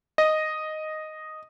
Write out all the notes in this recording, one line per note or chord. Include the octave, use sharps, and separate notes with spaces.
D#5